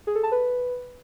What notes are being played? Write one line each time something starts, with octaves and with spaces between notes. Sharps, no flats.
G#4
A4
A5
B4